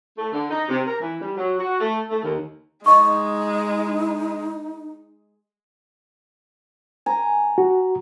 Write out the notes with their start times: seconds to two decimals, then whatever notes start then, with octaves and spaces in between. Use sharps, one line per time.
0.18 A3
0.33 D3
0.50 D#4
0.68 C3
0.87 A#4
1.01 E3
1.22 G3
1.38 F#3
1.59 F#4
1.80 A3
2.09 A3
2.23 D#2
2.86 G#3 D#4 D#5 C#6
7.06 G#5 A#5
7.58 F#4